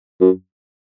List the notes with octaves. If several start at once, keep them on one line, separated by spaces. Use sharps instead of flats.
F#2